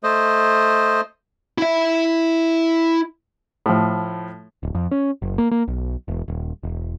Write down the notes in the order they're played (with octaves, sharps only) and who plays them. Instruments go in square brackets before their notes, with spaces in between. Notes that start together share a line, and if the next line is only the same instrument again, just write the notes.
[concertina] A3 C5 D#5
[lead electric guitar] E4 E5
[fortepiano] A2 F3
[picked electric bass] D1
F2
C#4
F#1
A#3
A#3
B1
E1
D#1
E1